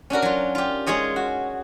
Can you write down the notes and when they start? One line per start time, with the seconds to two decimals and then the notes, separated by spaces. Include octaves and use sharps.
0.10 C#4 D4 F#4 A#4
0.22 F#3 F4
0.55 F4 G4
0.86 G#3 F4 G#4 C#5 D#5
1.16 F#4